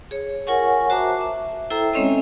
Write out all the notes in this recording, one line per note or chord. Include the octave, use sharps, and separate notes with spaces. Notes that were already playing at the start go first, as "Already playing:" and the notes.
G#4 C#5
F4 A#4 C#5 F#5 G#5 C#6
F#4 C5 E5 A5 A#5 D6
E5
E4 A4 C5 E5 G5 A#5
G#3 C4 C#4 C#5 D#5 E5